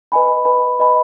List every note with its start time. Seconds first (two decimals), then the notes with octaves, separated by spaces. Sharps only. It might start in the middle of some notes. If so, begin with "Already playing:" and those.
0.12 B4 D#5 G#5 B5
0.45 B4 D#5 G#5 B5
0.79 B4 D#5 G#5 B5